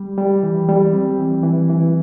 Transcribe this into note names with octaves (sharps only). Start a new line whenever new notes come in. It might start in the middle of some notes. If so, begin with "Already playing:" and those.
Already playing: G3
G3
E3
G3
C4
E3
E3
E3